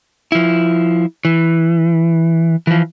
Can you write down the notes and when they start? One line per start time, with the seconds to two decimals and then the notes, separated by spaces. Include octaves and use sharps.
0.32 F3 E4
1.25 E3
2.67 E3 F3